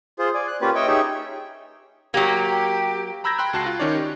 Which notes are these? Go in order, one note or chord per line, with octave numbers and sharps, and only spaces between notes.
F4 G#4 C5
D5 G#5
F#6
A#3 C#4 F4 G4 B4
C#5 D#5 E5 G5
D#4 G4 G#4 C#5 E5
F#3 A#3 G4
A#5 B5 E6 G6 G#6 A#6
G5 B5 C6 F#6
C#2 F#4 A5 F#6 C7
F4
D#3 C#4 D#4 C#5 D5
G4